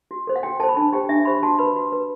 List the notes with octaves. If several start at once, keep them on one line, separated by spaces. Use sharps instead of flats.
F#4
A4 C5
F#5
F#4 G5
A4 C5 A5
B5
D4 A5
G4 C5 G5
D4 E5
G4 C5 B5
F#4 A5
B4 B5
F#4
B4